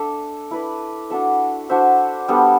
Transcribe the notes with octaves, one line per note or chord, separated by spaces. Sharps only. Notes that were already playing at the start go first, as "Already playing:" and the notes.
Already playing: D4 A4 E5
E4 B4 D5
D4 F#4 A4 E5
D4 F#4 C5 E5
G3 B3 D4 A4